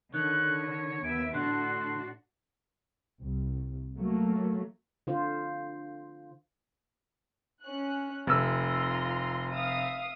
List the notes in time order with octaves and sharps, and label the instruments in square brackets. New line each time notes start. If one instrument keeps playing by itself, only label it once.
[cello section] D3 [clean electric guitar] D#3 [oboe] C#5 [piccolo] F#6
[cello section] D#2 B3 E5 [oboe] G#5 [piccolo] D7
[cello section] A2 D4 F#4 [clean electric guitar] D3 [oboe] C6 [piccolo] F#6
[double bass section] C2
F#3 A3 A#3
[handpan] D3 F4 C5
[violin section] C#4 F#6
[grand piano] F1 E6 [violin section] F4 A#5 C6
[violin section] E5 F5 D#6